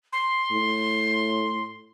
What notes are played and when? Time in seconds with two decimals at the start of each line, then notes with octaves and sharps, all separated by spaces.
0.13 C6
0.51 A2